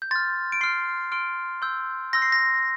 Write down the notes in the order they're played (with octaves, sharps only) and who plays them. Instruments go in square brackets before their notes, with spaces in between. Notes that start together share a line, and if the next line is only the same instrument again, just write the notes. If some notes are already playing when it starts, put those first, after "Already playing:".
[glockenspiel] G6
C6 F6 A6
D7
C6 F6 C7
C6 F6 D7
C6 E6 G6
C6 E6 G6 A#6
C7
A#6